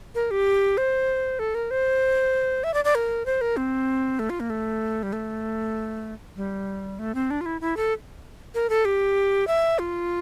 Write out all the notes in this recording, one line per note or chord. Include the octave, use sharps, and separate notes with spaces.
A#4
G4
C5
A4
A#4
C5
E5
D5
D5
A#4
C5
A#4
C4
A3
F4
A#3
A3
G3
A3
G3
A3
C4
D4
F4
E4
E4
A4
A#4
A4
G4
E5
F4